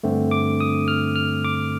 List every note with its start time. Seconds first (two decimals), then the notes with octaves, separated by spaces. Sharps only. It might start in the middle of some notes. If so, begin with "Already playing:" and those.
0.03 G2 D3 A3 C4
0.31 D6
0.60 D#6
0.88 F6
1.16 F6
1.45 D6